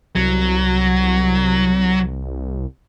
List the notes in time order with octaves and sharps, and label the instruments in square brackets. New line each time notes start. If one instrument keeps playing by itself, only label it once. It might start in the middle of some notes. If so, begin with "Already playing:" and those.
[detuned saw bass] C2 [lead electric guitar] F#3